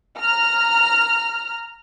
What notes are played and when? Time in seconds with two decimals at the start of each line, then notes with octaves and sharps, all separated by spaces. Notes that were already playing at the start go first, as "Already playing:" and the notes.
0.19 A#5 F6